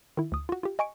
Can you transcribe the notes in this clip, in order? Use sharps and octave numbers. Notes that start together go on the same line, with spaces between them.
D#3 E4
D2 D#6
F4 F#4
F4 G4
D#5 G#5 C#6 C#7 D7